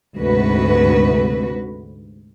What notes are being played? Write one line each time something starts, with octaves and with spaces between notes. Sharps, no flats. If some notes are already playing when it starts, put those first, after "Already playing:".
D2 G#2 C3 F#4 B4